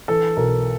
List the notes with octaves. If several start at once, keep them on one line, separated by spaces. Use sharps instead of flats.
E3 A4
B1 A#4